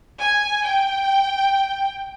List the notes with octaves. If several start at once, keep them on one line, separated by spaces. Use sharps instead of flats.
G#5
G5